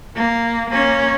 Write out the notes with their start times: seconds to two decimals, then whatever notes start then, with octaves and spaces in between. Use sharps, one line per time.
0.16 A#3
0.70 A#3 C#4